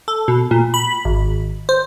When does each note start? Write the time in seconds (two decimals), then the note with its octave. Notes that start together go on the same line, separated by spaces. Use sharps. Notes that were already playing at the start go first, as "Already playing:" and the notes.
0.08 A4
0.28 B2
0.51 A#2
0.74 B5
1.05 G#1
1.69 C5